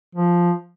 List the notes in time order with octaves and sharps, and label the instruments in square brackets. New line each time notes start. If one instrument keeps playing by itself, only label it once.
[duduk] F3